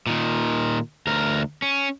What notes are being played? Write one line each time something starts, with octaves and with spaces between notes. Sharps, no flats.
A#2 D#3
D2 A#4
C#4